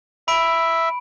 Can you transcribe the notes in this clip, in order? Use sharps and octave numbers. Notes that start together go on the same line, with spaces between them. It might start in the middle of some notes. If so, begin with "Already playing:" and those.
E5 B5 D7